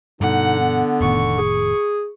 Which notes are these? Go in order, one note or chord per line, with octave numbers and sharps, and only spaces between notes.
G2 B2 D3 D#4 F#5
B3
F1 A2 D#3 C#6
G#4